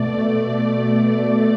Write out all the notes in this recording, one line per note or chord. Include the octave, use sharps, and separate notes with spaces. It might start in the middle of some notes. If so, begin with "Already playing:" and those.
Already playing: B2 A3 D5
D5